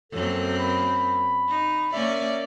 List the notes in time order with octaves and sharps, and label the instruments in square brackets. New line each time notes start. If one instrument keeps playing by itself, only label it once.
[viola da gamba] F#2 A#3 C4 [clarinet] A4
[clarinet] B5
[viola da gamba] D#4
[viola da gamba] A#3 C#4 D5 [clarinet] E5